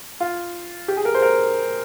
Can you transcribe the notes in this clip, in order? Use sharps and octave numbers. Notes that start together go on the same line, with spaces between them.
F4
G4
G#4
A#4
C5
A#4